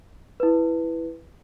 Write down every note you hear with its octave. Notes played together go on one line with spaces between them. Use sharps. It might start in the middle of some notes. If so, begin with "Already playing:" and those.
E4 B4